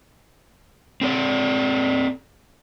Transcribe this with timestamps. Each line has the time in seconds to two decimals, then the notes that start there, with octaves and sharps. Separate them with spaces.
1.01 C4 A4 D5